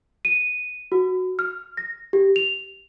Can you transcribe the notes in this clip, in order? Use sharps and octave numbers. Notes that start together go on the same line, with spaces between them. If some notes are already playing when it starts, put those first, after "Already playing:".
D#7
F#4
F6
A#6
G4
F7